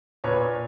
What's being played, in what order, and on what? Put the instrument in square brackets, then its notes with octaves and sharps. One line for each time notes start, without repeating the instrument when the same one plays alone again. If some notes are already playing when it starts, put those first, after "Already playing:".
[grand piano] A#2 B4 C#5